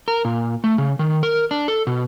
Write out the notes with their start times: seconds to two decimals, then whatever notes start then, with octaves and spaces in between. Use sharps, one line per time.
0.08 A#4
0.25 A#2
0.64 A3
0.78 C#3
0.99 D#3
1.23 A#4
1.51 D4
1.68 A4
1.87 B2